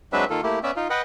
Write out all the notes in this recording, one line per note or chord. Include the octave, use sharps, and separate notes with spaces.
F#3 G#3 C4 D4 B4 E5
D#3 A#3 F4 A4
A3 A#3 E4 G4
B3 C#4 D5 E5
D#4 F4
B4 D#5 F#5 G5